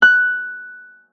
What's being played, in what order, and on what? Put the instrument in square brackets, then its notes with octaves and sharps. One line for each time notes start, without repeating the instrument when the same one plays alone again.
[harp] F#6